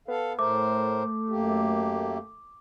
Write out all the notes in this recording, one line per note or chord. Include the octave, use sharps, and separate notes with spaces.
B3 A4 F5
A2 A3 A#4 C5 D6
F#2 A#3 G4